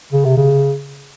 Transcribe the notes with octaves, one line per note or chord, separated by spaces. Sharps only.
C#3
C3
C#3